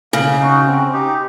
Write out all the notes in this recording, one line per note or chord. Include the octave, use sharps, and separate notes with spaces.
C#3 A#3
D#4 F#4
C4
D#4 G4